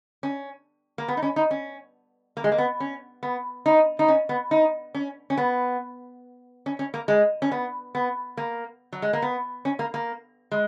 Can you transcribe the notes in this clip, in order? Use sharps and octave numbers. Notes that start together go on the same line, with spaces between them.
C#4
A#3
B3
D#4
C#4
D#4
C#4
A#3
G#3
A#3
B3
C#4
B3
D#4
D#4
C#4
B3
D#4
C#4
C#4
B3
C#4
C#4
A#3
G#3
C#4
B3
B3
A#3
F#3
G#3
A#3
B3
C#4
A#3
A#3
G#3